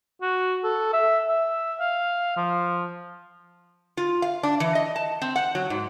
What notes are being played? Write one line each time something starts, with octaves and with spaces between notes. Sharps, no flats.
F#4
A4
E5
E5
F5
F3
F4
F5
D4
E3
D#5
A5
C4
F#5
F#3
G#2